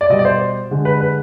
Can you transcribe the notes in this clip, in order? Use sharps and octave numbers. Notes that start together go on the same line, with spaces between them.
D5
B2 G3 D#5
D5
C5
D3 G#3
B4
B4